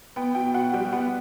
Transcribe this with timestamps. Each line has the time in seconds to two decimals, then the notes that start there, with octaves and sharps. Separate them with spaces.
0.16 B3 G5
0.35 B2 G5
0.54 B2 F#5
0.73 G3 G5
0.92 B3 F#5